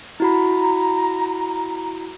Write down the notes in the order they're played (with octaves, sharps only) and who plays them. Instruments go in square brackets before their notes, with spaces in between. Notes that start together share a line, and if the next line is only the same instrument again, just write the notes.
[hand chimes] E4 F#4 B5 [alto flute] A#5